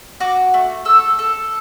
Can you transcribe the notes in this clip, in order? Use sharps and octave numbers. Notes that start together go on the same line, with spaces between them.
F#4 D6
A3
A4 E6
A4